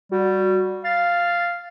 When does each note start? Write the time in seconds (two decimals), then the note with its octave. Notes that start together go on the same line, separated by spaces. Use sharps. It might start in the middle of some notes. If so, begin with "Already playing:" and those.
0.11 G3 F#4
0.84 F5 A6